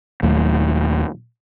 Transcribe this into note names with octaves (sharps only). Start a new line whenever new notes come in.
D#1 D#2 F#3 A3